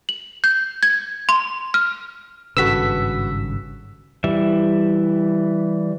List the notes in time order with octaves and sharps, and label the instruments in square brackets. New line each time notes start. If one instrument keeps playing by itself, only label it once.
[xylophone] F#7
G6
G#6
C6
F6
[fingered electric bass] G#1 G2 C#3 [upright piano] F#4 A4 B4 [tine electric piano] E6 B6
[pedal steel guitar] E3 G3 E5